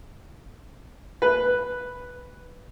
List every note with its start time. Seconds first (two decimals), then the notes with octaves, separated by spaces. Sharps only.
1.22 B4